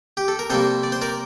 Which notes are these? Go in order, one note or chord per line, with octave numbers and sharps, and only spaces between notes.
G4
A4
A#4
C3 G3 A#3 A4 C5
D5
C5
A#4 D5